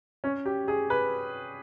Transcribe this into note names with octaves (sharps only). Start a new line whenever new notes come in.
C#4
G4
G#4
B4